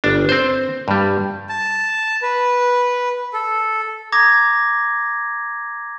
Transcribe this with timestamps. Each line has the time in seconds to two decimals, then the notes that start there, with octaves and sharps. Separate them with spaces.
0.04 G1 D4
0.29 C4 C5
0.88 G2 G3
1.49 A5
2.22 B4
3.34 A4
4.12 A#5 D6 D#6 G#6 A#6